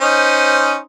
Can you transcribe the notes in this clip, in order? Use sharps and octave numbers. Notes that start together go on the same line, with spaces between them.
C#4 D#4 C5